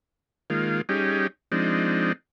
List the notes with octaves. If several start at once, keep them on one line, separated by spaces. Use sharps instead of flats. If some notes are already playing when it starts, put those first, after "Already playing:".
D#3 G#3 A#3 F4
G3 C#4 D#4 G4 G#4
F3 G#3 C4 D4 D#4